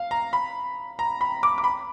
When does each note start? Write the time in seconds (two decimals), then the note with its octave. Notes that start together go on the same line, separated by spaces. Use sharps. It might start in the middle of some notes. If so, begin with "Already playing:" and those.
Already playing: F5
0.11 A#5
0.33 B5
0.99 A#5
1.21 B5
1.43 D6
1.58 D6
1.64 B5